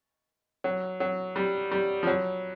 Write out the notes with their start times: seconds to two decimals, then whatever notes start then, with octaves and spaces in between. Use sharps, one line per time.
0.64 F#3
1.00 F#3
1.36 G3
1.71 G3
2.03 F3
2.07 F#3